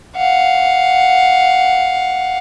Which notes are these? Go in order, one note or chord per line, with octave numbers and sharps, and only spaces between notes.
F5 F#5